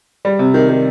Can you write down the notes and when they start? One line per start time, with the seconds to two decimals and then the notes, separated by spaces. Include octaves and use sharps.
0.25 G3
0.39 C3
0.54 D#3
0.69 D#3